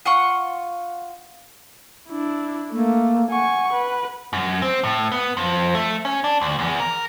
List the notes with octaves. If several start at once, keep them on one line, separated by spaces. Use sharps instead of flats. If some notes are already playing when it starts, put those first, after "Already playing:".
F4 F#5 C6 C#6
D4 E4
A3 A#3
F#5 G#5 C#6
B4
F#2
C4
A2
B3
F2
A3
C#4
D4
D2
E2
A#4